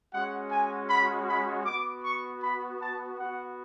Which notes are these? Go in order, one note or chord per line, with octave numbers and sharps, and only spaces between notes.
G#3 C#4 F#4 F#5
G#5
B5
B5
B3 F#4 D6
C#6
B5
A5
B3 F#4 F#5